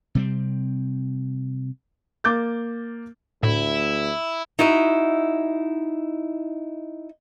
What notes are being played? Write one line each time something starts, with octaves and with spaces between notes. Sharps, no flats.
C3 G3 C4
A#3 D6 G6 A6
D2 A2 E4
D#4 E4 F#4 D#5 E5